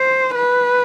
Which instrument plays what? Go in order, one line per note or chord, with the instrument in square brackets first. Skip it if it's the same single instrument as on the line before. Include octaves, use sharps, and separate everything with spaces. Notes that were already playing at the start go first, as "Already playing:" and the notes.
Already playing: [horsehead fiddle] C5
B4